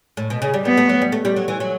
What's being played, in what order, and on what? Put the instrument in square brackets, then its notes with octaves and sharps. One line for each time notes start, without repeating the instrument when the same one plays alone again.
[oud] A2
B2
C#3
G3
[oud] G3 [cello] B3
[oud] A3
F#3
G3
A3
G3
F#3
E3
F#3